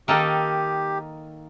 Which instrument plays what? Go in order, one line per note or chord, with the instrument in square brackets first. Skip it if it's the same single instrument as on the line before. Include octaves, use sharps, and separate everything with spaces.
[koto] D#3 A#3 D#4 A4 [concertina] G4